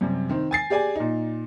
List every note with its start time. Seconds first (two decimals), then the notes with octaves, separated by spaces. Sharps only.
0.01 F#2 C3 G3
0.29 D#3 C4
0.51 G#5 A6 C7
0.70 G4 G#4 D5 G#5
0.96 A#2 D#4